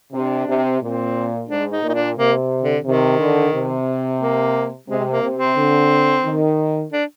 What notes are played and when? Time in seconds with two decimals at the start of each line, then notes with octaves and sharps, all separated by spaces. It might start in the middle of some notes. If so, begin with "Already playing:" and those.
0.13 C3 D4
0.48 C3
0.81 A#2 C4
1.49 G#2 D4
1.71 D#4
1.83 A#2
1.89 D#4
1.94 D4
2.17 C3 A#3
2.62 D3
2.85 C3 D#3
3.18 D3
3.53 C3
4.20 A#3
4.88 C3 G#3
5.11 A#3
5.22 C3
5.34 C4
5.56 D3
6.24 D#3
6.92 D4